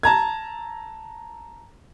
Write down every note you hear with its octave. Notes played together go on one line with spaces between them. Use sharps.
A5 A#5 G#6